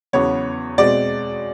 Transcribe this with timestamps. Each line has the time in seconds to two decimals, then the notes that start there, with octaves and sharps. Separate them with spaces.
0.13 E2 C#3 F#3 B3 C#5
0.78 B2 G#3 C4 D5